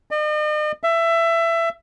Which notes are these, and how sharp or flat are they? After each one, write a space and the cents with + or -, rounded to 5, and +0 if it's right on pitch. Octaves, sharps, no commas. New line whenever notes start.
D#5 -45
E5 +20